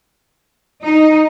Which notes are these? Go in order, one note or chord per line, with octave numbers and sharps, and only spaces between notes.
D#4